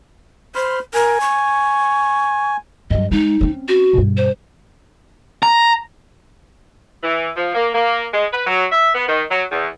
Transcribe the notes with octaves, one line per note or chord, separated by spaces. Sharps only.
C5 B5 C6 F6
A#4 G#5
C#6
G2 F#3 D#5
G#3 D#4
C4 C#4
F#4
G2 B2
C5
A#5
E3
F3
A#3
A#3
G#3
B4
F#3
E5
B3
D#3
F#3
E2